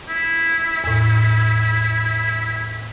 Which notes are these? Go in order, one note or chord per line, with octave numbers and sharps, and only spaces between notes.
E4
E2 A2